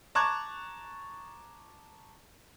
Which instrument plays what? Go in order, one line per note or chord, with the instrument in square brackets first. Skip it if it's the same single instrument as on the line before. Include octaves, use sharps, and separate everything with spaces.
[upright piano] A5 A#5 C#6 D6 F#6 G#6